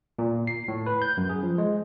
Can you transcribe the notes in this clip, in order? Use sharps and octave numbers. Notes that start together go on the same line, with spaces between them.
A#2
C7
A2
B4
G6
F#2
G#4
F3
G#3